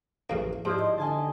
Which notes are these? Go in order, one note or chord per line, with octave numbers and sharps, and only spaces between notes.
A1 F#2 C#3 A#3 F5
G#2 F3 D#4 E4 G4 C5 D5
D#5
D3 D#5 G#5 A5
D#4 G4